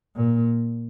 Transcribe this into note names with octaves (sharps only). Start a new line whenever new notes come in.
A#2